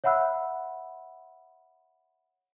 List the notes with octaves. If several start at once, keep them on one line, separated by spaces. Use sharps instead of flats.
C#5 E5 F#5 B5 E6 F#6